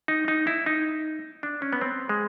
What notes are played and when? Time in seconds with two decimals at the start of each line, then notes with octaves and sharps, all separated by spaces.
0.08 D#4
0.28 D#4
0.47 E4
0.66 D#4
1.43 D4
1.62 C#4
1.73 B3
1.81 C4
2.09 G#3